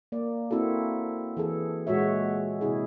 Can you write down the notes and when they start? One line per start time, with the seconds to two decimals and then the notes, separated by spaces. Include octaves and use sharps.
0.12 A#3 D5
0.51 A#3 C4 E4 F#4 A4
1.37 E3 G#4 A4
1.87 A#2 G#3 F#4 C#5 E5
2.61 C3 E4 G#4